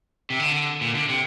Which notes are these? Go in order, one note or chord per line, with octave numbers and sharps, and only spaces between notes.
C3
D3
A#2
D3
C3